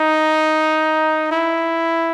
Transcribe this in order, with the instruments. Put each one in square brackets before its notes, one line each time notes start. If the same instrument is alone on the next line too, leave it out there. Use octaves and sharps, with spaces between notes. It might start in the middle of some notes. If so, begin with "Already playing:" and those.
Already playing: [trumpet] D#4
E4